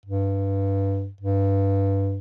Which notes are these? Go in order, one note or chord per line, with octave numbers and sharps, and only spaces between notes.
G2
G2